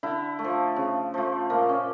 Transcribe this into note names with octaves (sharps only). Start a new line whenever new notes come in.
D3 E4
A3
F3
C#3
F3 A3
A#2 A#3
C#4